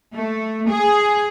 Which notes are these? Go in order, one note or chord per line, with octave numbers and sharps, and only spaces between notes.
A3
G#4